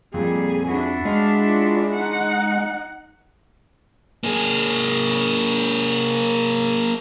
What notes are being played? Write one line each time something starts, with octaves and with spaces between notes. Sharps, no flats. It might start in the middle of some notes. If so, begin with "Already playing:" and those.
F2 A#2 G3 G#4
D4 E4 F#4
G#3 F5
F4 D5
D#4 F#5
A#3 G#4